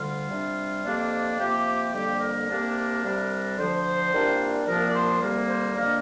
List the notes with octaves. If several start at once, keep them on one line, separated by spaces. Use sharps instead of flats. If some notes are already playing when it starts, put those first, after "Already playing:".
Already playing: D2 D3 G3 F4
C3 G3 D4
F2 C3 A#3 D4
C3 F3 A#3 G4
F2 D3 G3 A#3 G4
A#4
C2 C3 A#3 D4
C2 C3 G3 D4
D2 D3 F3 C5
C2 A#2 G3 A#3 D4
C2 A#2 F3 A#3 D4 A#4
D5
C5
D2 C3 G3 A#3
C5
F2 D3 A#3 D4 A#4